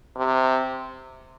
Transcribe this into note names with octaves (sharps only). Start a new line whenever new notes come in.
C3